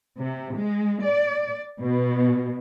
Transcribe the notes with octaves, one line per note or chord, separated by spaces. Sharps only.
C3
G#3
D5
B2